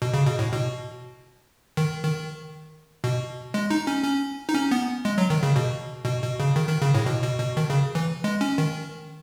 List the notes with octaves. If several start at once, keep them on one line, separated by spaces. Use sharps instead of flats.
B2
C#3
B2
A2
B2
D#3
D#3
B2
G#3
D#4
C#4
C#4
D#4
C#4
B3
G#3
F#3
D#3
C#3
B2
B2
B2
C#3
D#3
D#3
C#3
A2
B2
B2
B2
D#3
C#3
E3
G#3
C#4
D#3